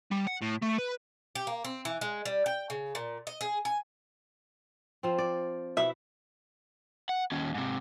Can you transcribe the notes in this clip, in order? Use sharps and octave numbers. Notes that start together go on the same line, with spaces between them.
G3
F#5
A2
A3
B4
G4
A#3
C4
E3
G#3
G3
G5
C#3
A#2
D#5
G#4
G#5
F3 C4
D5
B2 E4 E5
F#5
D#2 C#4
G#2 C3